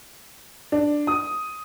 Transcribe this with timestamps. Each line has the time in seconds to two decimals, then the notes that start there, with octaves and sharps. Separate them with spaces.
0.72 D4
1.07 D#6